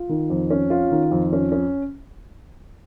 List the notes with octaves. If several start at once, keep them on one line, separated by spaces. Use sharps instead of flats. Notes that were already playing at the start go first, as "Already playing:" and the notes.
Already playing: F4
D#3
F2
C#4
F4
D#3
F2
C#4
C#4